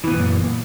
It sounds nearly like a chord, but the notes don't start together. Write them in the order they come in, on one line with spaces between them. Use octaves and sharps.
E3 B3 A#2 F#2